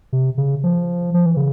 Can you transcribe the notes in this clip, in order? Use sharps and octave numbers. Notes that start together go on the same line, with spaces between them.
C3
C#3
F3
F3
E3
C#3